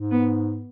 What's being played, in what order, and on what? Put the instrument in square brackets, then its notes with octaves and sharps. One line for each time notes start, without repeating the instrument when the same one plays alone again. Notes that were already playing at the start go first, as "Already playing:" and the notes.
Already playing: [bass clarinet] G#2
[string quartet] B3